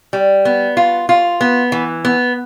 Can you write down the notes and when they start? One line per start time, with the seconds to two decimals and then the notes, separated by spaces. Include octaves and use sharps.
0.13 G3
0.45 B3
0.77 F4
1.09 F4
1.41 B3
1.72 E3
2.05 B3